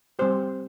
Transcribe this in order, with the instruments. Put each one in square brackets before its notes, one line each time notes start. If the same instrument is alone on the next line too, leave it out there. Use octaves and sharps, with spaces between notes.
[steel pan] G3 C4 G4 C5